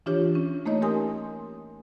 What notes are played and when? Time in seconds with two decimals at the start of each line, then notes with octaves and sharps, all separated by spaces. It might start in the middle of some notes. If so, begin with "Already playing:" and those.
0.06 E3 D4 F4 G4 C#5
0.35 C#4
0.66 A3 A#3 D#4 C#5 D#5
0.82 G4 A#4 G#5 C6 D#6